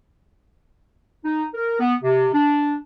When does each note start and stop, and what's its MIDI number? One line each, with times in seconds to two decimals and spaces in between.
1.24 1.44 63
1.54 1.77 70
1.79 1.93 59
2.03 2.28 48
2.32 2.75 62